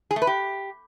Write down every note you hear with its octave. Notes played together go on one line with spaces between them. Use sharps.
G#4
A3
B4
G4